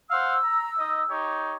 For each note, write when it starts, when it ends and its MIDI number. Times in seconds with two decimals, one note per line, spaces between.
0.10 0.37 72
0.10 0.37 77
0.10 0.37 78
0.10 1.10 88
0.43 0.70 82
0.77 1.02 63
0.77 1.02 75
0.77 1.02 87
1.08 1.56 63
1.08 1.56 67
1.08 1.56 73